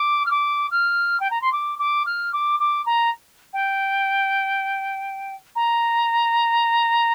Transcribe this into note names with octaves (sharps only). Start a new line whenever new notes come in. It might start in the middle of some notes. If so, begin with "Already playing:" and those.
Already playing: D6
F6
D6
F6
G5
A#5
C6
D6
D6
F6
D6
D6
A#5
G5
A#5